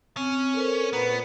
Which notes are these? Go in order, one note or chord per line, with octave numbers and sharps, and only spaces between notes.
C4 C#4
A4 A#4 C5
A#2 B3 B4 A#5